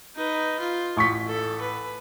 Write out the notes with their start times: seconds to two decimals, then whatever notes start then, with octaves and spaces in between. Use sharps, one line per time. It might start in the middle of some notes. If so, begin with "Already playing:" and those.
0.16 D#4 B4
0.60 F4
0.97 A1 C#6 B6
1.28 A4
1.61 B4